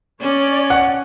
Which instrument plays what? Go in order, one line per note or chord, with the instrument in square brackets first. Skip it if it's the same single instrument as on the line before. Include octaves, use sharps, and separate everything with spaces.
[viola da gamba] C#4 [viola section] C#5 D5
[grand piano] F#5